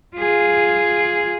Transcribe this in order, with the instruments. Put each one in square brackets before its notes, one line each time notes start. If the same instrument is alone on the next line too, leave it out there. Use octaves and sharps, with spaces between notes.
[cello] F4 G#4